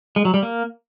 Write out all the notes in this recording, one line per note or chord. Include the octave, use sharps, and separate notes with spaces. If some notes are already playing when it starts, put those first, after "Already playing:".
G#3
F#3
G3
A#3